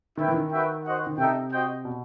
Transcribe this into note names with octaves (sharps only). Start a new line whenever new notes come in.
D#3 E4 B4 E5 G5
E3
D#3
F#4 B4 E5 G5
F#4 C5 D#5 F#5
D#3
C3 D#4 A4 E5 G5
F#4 C5 D#5 G5
B2